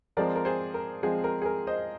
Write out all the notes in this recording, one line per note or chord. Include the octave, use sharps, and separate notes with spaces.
F3 G#3 C4 A#4 D5
A#4
G#4 C5
A#4
F3 G#3 C4 G#4
A#4
G#4
A#4
C5 D#5